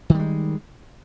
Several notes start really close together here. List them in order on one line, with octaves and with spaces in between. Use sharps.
D#3 G3 G#3